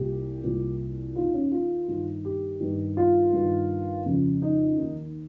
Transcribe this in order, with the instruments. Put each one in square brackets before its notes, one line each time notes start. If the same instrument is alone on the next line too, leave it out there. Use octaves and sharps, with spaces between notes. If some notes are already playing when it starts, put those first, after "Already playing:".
Already playing: [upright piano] C2 A#2 G4
C2 A#2
D#2 D#3 F4
C#4
F4
G2 D#3
G4
G2 D#3
F4
G2 D#3
F2 C#3
D#4
D#2 D#3